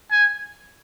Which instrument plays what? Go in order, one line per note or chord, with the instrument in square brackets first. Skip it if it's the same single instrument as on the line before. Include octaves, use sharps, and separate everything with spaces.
[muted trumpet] G#5